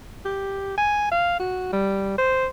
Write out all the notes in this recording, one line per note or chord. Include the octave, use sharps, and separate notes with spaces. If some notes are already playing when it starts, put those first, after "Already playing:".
G4
G#5
F5
F#4
G3
C5